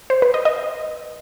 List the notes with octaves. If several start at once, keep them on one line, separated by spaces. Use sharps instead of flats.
C5
B4
D#5
D#5